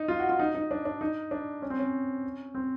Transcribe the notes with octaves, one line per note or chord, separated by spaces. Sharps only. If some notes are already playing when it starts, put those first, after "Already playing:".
Already playing: D#4
F4
F#4
F4
D#4
D#4
D4
D4
D#4
D4
C#4
C4
C#4
C4